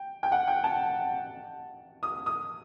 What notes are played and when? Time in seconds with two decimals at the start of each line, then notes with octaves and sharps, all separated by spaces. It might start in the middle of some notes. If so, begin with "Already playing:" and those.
Already playing: G5
0.23 G5
0.32 F#5
0.48 G5
0.64 A5
2.03 D#6
2.26 D#6